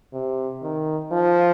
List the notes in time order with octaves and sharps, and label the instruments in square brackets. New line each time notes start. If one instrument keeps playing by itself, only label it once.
[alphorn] C3
D#3
F3